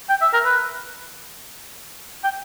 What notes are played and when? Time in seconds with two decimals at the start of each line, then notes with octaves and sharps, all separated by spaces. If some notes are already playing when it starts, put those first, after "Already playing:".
0.09 G5
0.22 E5
0.33 A#4
0.45 B4
2.24 G5